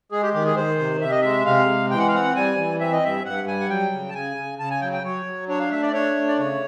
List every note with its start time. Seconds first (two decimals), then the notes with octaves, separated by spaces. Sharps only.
0.12 G#3 G#4
0.23 G4
0.34 D#3 G4
0.45 G#4
0.56 D#3 C5
0.79 C3
1.01 C3 E5
1.11 D#5
1.21 G#3 E5
1.46 C3 F5
1.68 G#3
1.91 E3 G5
1.99 F#5
2.08 F5
2.13 C4 F#5
2.36 G3 G#5
2.57 E3
2.80 C4 E5
2.92 D#5
3.03 G2 E5
3.25 G2 F#5
3.47 G3 G#5
3.60 F#5
3.70 F#3 G5
3.92 C#3
4.09 A5
4.14 C#3 G#5
4.37 C#3
4.59 C#3 A5
4.70 G#5
4.81 F#3 G5
4.93 G5
5.04 F#3 C#5
5.26 F#3
5.48 D4 C#5
5.60 F5
5.71 A3 E5
5.82 D5
5.93 D4 C#5
6.16 A3
6.28 D5
6.38 C#3 C#5